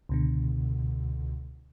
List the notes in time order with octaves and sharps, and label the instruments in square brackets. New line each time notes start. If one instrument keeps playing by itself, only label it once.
[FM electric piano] C#2 B2 D3